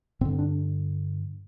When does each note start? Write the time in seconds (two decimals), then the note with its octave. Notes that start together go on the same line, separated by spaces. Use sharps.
0.21 G2 C4
0.25 D3
0.39 D4